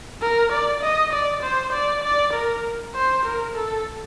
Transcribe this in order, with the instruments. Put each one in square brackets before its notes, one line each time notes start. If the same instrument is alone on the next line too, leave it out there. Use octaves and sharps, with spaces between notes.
[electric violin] A#4
D5
D#5
D5
C5
D5
D5
A#4
C5
A#4
A4